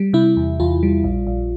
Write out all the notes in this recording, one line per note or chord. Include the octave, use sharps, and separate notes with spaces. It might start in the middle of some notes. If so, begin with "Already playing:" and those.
Already playing: G3
C3 E4
E2
E2 F4
G3
A#1
A#1